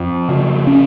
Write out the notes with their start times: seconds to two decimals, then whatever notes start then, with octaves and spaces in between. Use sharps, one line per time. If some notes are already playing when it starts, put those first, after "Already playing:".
Already playing: F2
0.28 C#3
0.67 C#4